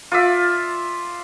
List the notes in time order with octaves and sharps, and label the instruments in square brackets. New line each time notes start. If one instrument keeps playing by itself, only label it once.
[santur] F4 D5 E5